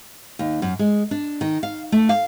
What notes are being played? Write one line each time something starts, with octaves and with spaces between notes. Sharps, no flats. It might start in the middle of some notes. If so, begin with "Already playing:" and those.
D#2
F#2
G#3
D4
D#3
F5
A3
F5